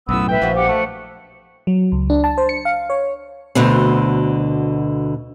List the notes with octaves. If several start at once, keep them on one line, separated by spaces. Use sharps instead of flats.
B1 F#2 A2 B3 E6
B4 E5 G5
A#1 F3 F#4
G4 F#5
A3
F#3
C#2
D4
A5
C5
C#7
F5
C#5
D2 B2 D3 C4